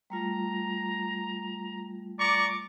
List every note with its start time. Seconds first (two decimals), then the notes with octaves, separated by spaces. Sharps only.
0.10 G3 A3 F4 A#5
2.20 D5 A#5 C#6 D6